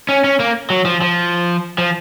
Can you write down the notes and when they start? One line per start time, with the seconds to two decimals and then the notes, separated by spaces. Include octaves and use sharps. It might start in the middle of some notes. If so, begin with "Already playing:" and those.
0.09 C#4
0.24 C#4
0.40 A#3
0.70 F#3
0.85 F3
1.01 F3
1.78 F3